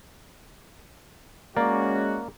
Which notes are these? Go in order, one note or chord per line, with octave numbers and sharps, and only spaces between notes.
G#3 A#3 C#4 F#4 D5